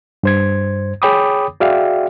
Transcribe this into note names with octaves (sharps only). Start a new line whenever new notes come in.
G2 C5 G#6
G#4 C#5 G5 B5 D6 D#6
F#4 G#4 D5 E5 F5 G5